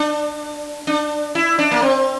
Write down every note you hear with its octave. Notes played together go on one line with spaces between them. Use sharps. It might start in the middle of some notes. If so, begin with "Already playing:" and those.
Already playing: D4
D4
E4
D4
A#3
C4